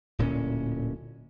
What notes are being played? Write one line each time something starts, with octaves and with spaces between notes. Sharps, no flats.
D1 A#2 B3 C#4